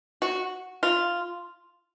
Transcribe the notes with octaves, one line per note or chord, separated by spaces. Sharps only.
F#4
F4